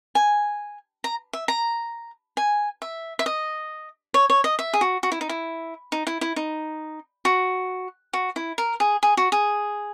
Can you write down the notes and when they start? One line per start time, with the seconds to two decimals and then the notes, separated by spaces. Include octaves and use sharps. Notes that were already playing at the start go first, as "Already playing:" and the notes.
0.15 G#5
1.04 A#5
1.33 E5
1.48 A#5
2.37 G#5
2.82 E5
3.19 E5
3.26 D#5
4.14 C#5
4.30 C#5
4.44 D#5
4.59 E5
4.74 G#4
4.81 F#4
5.03 F#4
5.12 E4
5.21 D#4
5.29 E4
5.92 D#4
6.07 E4
6.21 E4
6.36 D#4
7.25 F#4
8.13 F#4
8.36 E4
8.58 A#4
8.80 G#4
9.03 G#4
9.17 F#4
9.32 G#4